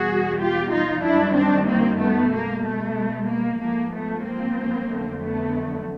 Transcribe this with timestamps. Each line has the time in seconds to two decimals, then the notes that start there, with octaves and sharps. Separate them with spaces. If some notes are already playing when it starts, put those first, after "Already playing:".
Already playing: E2 B2 G3 F#4 G#4
0.37 F4 G4
0.70 D#4 F4
1.02 F#2 D#3 G3 D4 E4
1.34 C4 D4
1.66 A#3 C4
1.98 A3 B3
2.31 B2 G#3 A#3
2.63 A3
3.27 A#3
3.59 G#2 F3 A3 A#3
3.91 A3 B3
4.23 A#3 C4
4.88 F2 D3 F#3 A3
5.19 A3 B3